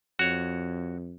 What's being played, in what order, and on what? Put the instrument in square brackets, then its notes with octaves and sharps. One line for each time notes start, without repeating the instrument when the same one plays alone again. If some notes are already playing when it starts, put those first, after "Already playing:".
[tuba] F2 [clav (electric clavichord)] F#4 C#5